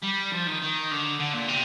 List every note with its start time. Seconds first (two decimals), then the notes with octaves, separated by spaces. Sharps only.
0.03 G3
0.33 F3
0.47 D#3
0.62 D#3
0.91 D3
1.19 D3
1.33 A#2
1.48 C3